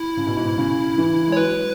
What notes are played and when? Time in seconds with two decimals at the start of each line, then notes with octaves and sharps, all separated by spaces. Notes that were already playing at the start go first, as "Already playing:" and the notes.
Already playing: E4
0.17 C#3
0.27 B2
0.37 G#2
0.45 B2
0.57 C#3
0.98 E3
1.28 G#3
1.32 C#5
1.37 F#3 B4